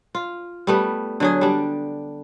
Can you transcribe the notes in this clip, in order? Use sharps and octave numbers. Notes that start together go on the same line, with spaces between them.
F4
G3 A3 B3
D3 F#3 G#4
G3 D4